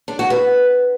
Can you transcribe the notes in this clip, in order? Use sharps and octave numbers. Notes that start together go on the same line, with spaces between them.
D4
F#4
B4